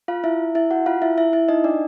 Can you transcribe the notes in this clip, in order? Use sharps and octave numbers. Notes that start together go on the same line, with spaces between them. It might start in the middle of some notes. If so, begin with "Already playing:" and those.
F4 F5
E4 E5
E4 E5
F#4 F#5
F4 F5
E4 E5
E4 E5
E4 E5
D#4 D#5
D4 D5